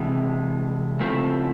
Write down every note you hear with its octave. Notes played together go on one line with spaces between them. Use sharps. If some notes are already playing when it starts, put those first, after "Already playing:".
Already playing: C3 E3 G#3
C#3 F3 A3 C4 E4